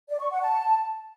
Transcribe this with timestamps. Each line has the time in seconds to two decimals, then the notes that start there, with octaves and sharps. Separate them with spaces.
0.09 D5
0.20 C#6
0.31 F#5
0.41 A5